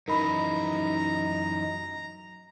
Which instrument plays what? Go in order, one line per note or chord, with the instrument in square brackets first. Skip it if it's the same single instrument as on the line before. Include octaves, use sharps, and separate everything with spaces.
[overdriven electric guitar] F#2 E3 [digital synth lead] D#4 [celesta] A#4 B5 [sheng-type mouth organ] A#5